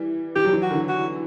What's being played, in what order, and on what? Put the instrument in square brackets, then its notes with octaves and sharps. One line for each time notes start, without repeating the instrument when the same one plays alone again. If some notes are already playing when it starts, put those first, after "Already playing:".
Already playing: [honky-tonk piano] E3 G3
[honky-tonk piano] E3 [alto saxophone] G4
[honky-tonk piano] F#3
E3
[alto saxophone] F#4
[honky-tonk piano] D3
E3
[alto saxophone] F#4